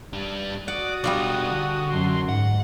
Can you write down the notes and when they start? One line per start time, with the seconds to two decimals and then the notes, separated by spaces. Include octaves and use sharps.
0.13 G2 D4
0.68 F#4 D5 F#5 D#6
1.04 B2 G3 D4 F4 D5
1.52 D3
1.91 F#2 C6
2.29 G#2 F#5